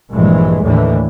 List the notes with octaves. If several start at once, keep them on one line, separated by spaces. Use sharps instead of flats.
A#1 G2 E3 G#3
D#2 A2 D3 E3